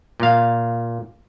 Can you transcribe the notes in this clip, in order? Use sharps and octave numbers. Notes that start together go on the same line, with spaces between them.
A#2 F5